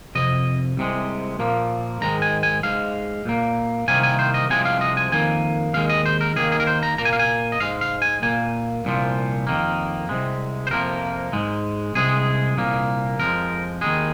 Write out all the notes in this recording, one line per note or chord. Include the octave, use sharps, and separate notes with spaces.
F2 C3 D#5
C2 C3 G#3
A#2 F3 A#3
G#2 D#3 G#3 A#5
G#5
G#5
G#2 G#3 F5
A#2 A#3
C2 C3 D#3 A#3 G#5
G#5
C5
D#5
C2 C3 F3 G#3 G#5
F5
D#5
G#5
F2 D#3 A#3 G#5
D#2 D#3 G#3 F5
D#5
C5
A#4
D#2 D#3 A#3 G#4
G#4
A#4
C5
A#5
A#2 A#3 A#5
G#5
F5
G#5
D#5
G#2 G#3 F5
F5
G#5
A#2 A#3 G#5
C2 A#2 F3
F2 D#3 A#3
C2 C3 G#3
C5
F2 C3 F3 A#3 A#4
G#2 G#3
C2 C3 G#3 G#4
C2 A#2 A#3
F2 F3 G#3 A#4
D#2 D#3 G#3 G#4